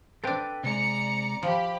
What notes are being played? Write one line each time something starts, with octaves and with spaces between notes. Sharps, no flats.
C4 D4 A4 B4 G5
C3 G#3 D5 A#5 C#7
F3 G4 B5